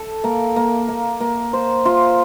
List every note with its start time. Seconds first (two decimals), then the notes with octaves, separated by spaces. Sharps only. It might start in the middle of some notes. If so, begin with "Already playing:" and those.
Already playing: A4
0.24 A#3
0.56 A#3
0.88 A#3
1.20 A#3
1.53 C5
1.85 F4